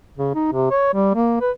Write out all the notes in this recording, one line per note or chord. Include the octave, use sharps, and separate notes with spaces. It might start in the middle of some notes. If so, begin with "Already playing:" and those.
C#3
D#4
C3
C#5
G3
A#3
B4